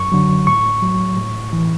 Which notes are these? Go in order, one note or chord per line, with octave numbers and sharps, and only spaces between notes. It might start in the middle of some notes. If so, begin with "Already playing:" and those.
Already playing: F#2 C#6
D3 F#3
A2 C#6
F#3
A2
E3